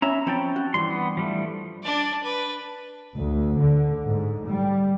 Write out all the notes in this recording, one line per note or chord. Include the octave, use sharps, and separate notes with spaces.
C#4 E5 A#5 B5
F3 C4 C#4 G5 A5 B5
F#4
G2 E3 C6
B3
F3 G3 A3
D4 D5
B4
D2
D3
G#2
G3